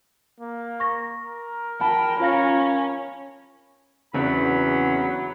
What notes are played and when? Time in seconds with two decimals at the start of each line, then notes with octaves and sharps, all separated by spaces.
0.40 A#3
0.80 C#6 A#6
1.15 A#4
1.81 G5 A5 B5
2.20 C#4 F4 F5 A#6
4.14 E2 C#3 F#3 C4 D4 B5